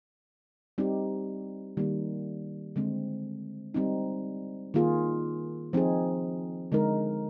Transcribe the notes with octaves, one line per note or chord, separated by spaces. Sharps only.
G3 C4 D#4 G4
D#3 G3 A#3
D3 G#3 C4
G3 C4 D#4
D#3 A#3 F4 G#4
F3 C4 D#4 G#4
D3 G#3 D#4 A#4